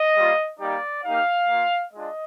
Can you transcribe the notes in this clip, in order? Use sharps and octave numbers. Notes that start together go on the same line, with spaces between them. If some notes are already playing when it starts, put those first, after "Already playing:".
Already playing: D#5
G3 A#3 F4
G3 A#3 D#4 G4 D5
A#3 D#4 G4 F5
A#3 F4
G#3 D4 F4 D#5